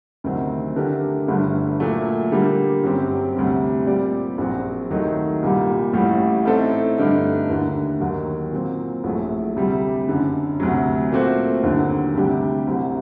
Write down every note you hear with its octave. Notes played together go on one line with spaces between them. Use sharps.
D2 C3 D#3 F#3 C4
D3 A3 D4 G4 A#4
G1 G2 D3 A3
A#2 F#3 A3
D3 G3 A#3
G1 F#2 F#3 C4 G4
D2 C3 G3 C4
A#2 G3 C4 G4 D5
A#1 A#2 F#3 C4 F#4
D#2 D#3 F#3 A3 D#4
C2 A#2 G3
A1 A2 G3
A2 A3 C4 D#4 A4
G2 D3 A3 D#4
D#2 D3 A3
D#2 D#3 F#3
A#2 F#3 C4
A#1 A2 F#3 A3
D2 C3 G3
F#1 F#2 D3
D2 C3 F#3
A#2 A3 C4 F#4 C5
D#2 D3 F#3
D2 C3 G3 D4 G4
C2 C3 F#3 C4 G4